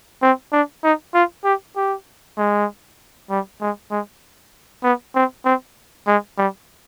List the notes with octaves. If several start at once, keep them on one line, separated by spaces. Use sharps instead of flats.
C4
D4
D#4
F4
G4
G4
G#3
G3
G#3
G#3
B3
C4
C4
G#3
G3